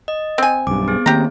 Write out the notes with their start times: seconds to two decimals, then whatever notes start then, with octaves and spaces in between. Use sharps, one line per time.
0.08 D#5
0.38 C4 G#5
0.67 B1 G2 D6
0.88 B3 G#4
1.06 D#3 A#3 C4 G4 A#5